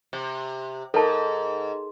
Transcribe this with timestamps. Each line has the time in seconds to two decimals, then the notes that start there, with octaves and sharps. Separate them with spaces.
0.13 C3
0.94 G#2 A4 A#4 A5